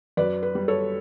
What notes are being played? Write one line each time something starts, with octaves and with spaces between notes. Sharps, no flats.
F#2 B4 D5
B4
G3
A4 C#5